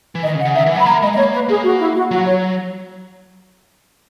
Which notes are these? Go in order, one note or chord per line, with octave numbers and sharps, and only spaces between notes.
E3
D#3 D#5
C#3
F#5
C#3
D#3 E5
E3 F#5
F#3 B5
A#3 A#5
G#3 D#5
D#5
A#3 C#5
B4
A#3 G#4
F#4
E4
F#4
F#3 F#4
C#5